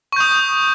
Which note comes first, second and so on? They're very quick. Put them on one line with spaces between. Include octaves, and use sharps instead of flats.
C#6 G6 D#6